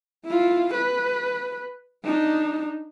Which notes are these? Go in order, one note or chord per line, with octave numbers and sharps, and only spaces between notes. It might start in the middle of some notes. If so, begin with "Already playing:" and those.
E4 F4
B4
D4 D#4